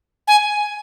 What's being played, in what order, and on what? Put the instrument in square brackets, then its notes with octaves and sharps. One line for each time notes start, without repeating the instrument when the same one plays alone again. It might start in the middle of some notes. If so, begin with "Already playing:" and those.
[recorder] G#5